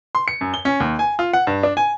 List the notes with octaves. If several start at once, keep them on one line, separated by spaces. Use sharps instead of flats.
C6
C#7
F#2
G7
C#4
D#2
G#5
F4
F#5
G2
D4
G#5